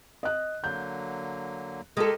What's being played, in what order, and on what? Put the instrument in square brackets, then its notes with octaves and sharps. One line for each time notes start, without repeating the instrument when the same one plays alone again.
[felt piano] D#5 F#6
[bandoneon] D3 F#3 A#3 [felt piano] G6
[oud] G#3 A4 [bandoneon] G4 A#4 D#5